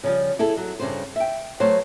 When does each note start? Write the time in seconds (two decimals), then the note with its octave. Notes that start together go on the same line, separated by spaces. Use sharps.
0.04 C#3 F3 G3
0.39 E4 G#4 A4
0.57 F#3
0.80 G2 C#3 C5
1.16 E5 G5
1.60 F#3 A3 B3 C5 C#5 F5